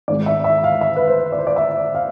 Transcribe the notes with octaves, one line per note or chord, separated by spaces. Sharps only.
G#1 G#2 E3 G#3 D5
E5
E5
F5
E5
B4
C5
D5
C5
D5
E5
F5